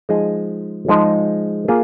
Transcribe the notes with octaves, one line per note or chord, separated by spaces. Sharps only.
F3 G#3 D#4 G#4 D#5
F3 G#3 D#4 G#4 D#5
A#3 F4 G#4